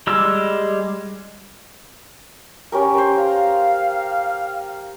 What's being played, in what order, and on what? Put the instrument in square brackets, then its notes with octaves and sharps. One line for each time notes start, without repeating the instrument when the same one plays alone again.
[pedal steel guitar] G3 G#3 E6
[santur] C#4 G4 A#4
A#4 C5
[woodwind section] F5 [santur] A#5